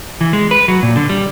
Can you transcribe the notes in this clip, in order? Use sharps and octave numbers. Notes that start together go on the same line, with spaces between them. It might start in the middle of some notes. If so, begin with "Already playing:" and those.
E3
G#3
B4
F#3
A#2
D3
G3